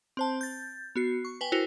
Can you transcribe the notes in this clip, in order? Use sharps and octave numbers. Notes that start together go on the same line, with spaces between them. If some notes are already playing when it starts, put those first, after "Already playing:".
C4 C5 A5
G6 A6
B3 F#4 C7
C#6
B4 G5 G#5
E4 F#4 A#4 C5